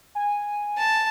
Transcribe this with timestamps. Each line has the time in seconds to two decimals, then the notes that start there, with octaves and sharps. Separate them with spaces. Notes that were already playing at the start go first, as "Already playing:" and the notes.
0.15 G#5
0.78 A5